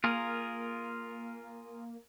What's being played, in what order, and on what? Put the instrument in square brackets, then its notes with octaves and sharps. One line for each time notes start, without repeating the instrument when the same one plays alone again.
[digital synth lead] A#3 [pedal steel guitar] F4 G#4 A#4